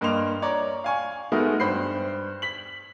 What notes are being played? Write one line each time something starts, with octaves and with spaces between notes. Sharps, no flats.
G2 A#3 D#5 C6 F7
C#5 D5 A#5
F5 G#5 C#6
G#3 A3 B3 D#4 F#4 A#4
G2 C5 B5 C7
B6 F#7